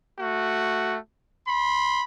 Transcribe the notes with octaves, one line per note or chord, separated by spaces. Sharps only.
A3 F#4
B5 C6